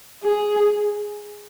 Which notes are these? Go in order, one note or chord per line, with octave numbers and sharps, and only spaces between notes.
G#4